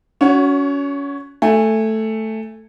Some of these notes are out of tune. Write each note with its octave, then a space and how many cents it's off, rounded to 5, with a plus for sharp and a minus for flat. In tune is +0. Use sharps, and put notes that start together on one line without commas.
C#4 +25 F#4 +0 C#5 +0
A3 +0 G#5 -15